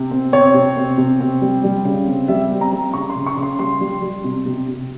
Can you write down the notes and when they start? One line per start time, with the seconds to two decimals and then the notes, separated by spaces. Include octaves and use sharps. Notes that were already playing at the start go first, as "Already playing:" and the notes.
Already playing: C3
0.11 C4
0.32 C4 C#5
0.54 C3
0.76 C4
0.98 C3
1.20 C4
1.42 G3
1.64 G3
1.85 C#3
2.07 C4
2.28 G3 E5
2.51 C4
2.61 A#5
2.72 G3
2.94 C#3 C#6
3.10 C6
3.16 C#3
3.26 C#6
3.37 C#3
3.43 C6
3.59 G3 C6
3.81 G3
4.02 G3
4.24 C3
4.46 C3
4.68 C3